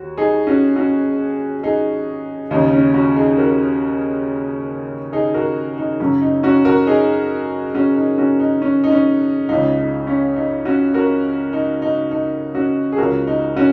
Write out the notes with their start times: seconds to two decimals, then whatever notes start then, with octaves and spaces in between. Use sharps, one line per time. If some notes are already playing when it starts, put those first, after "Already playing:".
Already playing: D#2 F#4
0.18 D#4 G#4
0.47 C#4 F#4
0.76 C#4 F#4
1.63 D#4 G#4
2.51 D#2 C#3 D#4
2.73 C#4
2.94 C#4 F#4
3.16 D#4 G#4
3.38 F#4 A#4
5.12 D#4 G#4
5.34 F#4 A#4
5.78 D#4
6.00 F#2 C#3 C#4
6.22 D#4
6.43 C#4 F#4
6.65 F#4 A#4
6.87 D#4 G#4
7.75 C#4 F#4
7.96 D#4
8.18 C#4 F#4
8.40 D#4
8.62 C#4
8.84 D#4
8.91 C#4
9.49 C#2 C#3 D#4
9.78 D#4
10.07 C#4
10.36 D#4
10.65 C#4 F#4
10.94 F#4 A#4
11.53 D#4
11.82 D#4
12.11 D#4
12.55 C#4 F#4
12.92 G#4
12.98 C#2 C#3 F#4 A#4
13.27 D#4
13.56 C#4 F#4